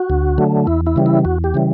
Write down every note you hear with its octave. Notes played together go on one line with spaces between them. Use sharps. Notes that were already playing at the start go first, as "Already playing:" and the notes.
Already playing: F#4
D2
D3 F#3 A3
E2 E4
E4
C#3 E3 G3
E4
E2 F#4
G4
C#3 E3 G3